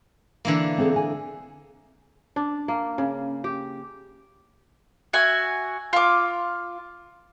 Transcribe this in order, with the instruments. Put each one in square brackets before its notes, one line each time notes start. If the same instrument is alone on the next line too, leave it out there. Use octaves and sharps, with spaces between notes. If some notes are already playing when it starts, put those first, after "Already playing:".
[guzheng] D3 E3 A#3
[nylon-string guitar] C4 G#4 A4
G#4 G#5
[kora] D4
A#3
C#3
G4
[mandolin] F#4 E5 G#5
F4 D6